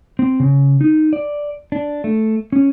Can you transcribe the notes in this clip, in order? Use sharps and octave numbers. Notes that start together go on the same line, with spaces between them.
C4
C#3
D#4
D5
D4
A3
C#4